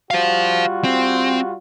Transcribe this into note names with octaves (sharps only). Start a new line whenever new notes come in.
G3 F4 F#4 C5 F5
C4